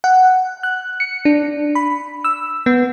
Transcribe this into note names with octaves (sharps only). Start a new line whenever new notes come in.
F#5
F#6
C#7
D4
B5
E6
B3